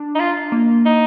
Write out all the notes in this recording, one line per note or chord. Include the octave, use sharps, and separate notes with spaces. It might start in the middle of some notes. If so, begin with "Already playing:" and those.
Already playing: D4
D#4
F4
A#3
D#4